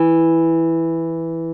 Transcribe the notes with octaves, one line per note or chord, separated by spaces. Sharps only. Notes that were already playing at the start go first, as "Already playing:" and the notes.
Already playing: E3